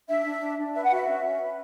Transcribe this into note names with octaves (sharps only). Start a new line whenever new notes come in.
D4 E5
D4
D4
D4
B4 E5
F#5
F#4 E5
C#4
C#4
B4